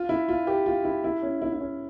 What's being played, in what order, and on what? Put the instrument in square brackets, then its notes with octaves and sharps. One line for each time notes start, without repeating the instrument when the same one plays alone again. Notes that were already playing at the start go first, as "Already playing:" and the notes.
Already playing: [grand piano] F4
E4
F4
G4
F4
E4
E4
C#4
E4
E4
C#4